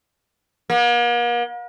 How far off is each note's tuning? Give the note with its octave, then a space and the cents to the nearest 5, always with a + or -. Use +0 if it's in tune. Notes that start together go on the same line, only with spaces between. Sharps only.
A#3 +45